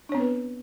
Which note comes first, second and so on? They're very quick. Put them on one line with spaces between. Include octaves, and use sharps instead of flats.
D4 C#5 C4 B3 B4